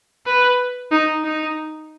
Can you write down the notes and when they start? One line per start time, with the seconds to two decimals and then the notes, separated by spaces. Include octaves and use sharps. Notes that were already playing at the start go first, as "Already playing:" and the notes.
0.26 B4
0.91 D#4
1.24 D#4